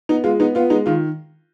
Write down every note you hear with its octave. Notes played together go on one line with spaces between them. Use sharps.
B3 D#4
G#3 F4
B3 D#4
B3 F4
G#3 D#4
D#3 F4